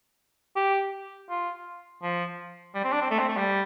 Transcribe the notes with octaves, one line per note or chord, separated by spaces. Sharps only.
G4
F4
F3
G3
C4
D4
C4
A3
C4
A3
G3